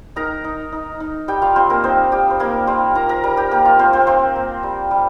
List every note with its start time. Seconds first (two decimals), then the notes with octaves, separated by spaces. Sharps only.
0.16 D#4 A#4 A#5
0.44 D#4
0.72 D#4
1.00 D#4
1.28 G3 G4 G5
1.42 F4 F5
1.56 G3 C4 C5
1.70 A#3 A#4
1.84 C4 D#4 C5
2.12 G3 G4
2.30 C5
2.40 G3 A#3 A#4
2.67 G3 C4 C5
2.95 F4 A#4 A#5
3.09 A#4 A#5
3.23 G3 A#4 A#5
3.37 G4 G5
3.51 A#3 A#4 A#5
3.65 F4 F5
3.79 A#3 C4 C5
3.93 C4 C5
4.02 A#4
4.07 C4 F4 C5
4.36 A#3
4.63 G3
4.91 G3